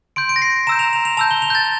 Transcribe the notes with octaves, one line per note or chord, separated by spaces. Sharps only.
C6 G6 D7
D7
A#6
C7
A#5 E6 G6 E7
F7
F7
F7
A5 E6 G6 F7
G7
F7
G6
A6